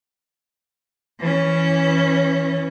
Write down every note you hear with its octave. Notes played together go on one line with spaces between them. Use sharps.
E3 C#4